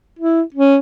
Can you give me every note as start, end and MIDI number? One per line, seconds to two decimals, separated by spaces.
0.19 0.42 64
0.54 0.78 61